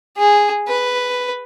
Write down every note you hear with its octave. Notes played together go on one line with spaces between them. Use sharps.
G#4
B4